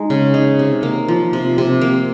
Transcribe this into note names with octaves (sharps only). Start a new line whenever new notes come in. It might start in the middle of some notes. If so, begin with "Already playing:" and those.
Already playing: G#3 D#4
C#3
D#4
C3
A#3
F3
C3
C3
A#3